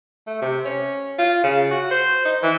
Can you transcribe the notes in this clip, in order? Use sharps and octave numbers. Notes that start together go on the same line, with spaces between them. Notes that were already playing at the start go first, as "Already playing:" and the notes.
A3
C3
C#4
F4
C#3
F#4
C5
D#4
E3